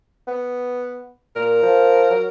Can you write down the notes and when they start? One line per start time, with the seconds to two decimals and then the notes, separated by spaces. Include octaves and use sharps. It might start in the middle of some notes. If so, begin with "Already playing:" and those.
0.27 B3
1.36 A#2 A#4
1.63 F3
2.11 F#3